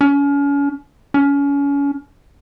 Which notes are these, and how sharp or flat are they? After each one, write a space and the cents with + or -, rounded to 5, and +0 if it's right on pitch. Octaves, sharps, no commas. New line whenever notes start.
C#4 +35
C#4 +30